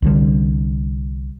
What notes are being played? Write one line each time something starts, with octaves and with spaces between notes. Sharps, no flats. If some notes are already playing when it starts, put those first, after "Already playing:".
C2 D3 G3